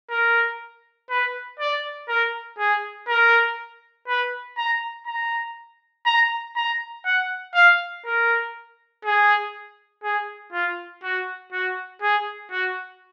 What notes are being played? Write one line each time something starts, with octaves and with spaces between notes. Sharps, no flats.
A#4
B4
D5
A#4
G#4
A#4
B4
A#5
A#5
A#5
A#5
F#5
F5
A#4
G#4
G#4
F4
F#4
F#4
G#4
F#4